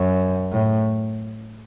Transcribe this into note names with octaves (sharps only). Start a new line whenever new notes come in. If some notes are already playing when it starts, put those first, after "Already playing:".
Already playing: F#2
A2